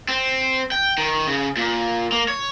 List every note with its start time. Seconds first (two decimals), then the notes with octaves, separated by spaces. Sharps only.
0.08 C4
0.71 G5
0.98 D#3
1.27 C#3
1.56 A#2
2.12 A#3
2.28 C#5